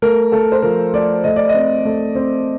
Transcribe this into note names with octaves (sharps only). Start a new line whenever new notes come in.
A3 A#4
A3 A4
C5
F3 A#4
A3 D5
A3 D#5
D5
D#5
C4
A3
C4